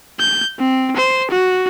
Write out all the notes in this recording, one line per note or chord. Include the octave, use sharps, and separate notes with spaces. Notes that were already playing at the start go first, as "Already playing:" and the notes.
G6
C4
C5
F#4